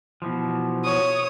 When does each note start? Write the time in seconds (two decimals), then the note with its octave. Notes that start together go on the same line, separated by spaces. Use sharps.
0.22 B2 E3 F3
0.85 C#5 D#6